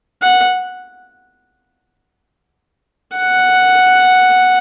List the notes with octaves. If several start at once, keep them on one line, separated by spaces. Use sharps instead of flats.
F#5
F#5